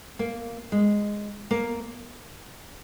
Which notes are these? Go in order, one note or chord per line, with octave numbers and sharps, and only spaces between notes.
A#3
G#3
A#3